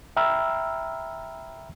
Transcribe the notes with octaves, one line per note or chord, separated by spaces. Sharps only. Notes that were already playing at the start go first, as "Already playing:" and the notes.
E5 G5 A#5 B5 E6 F6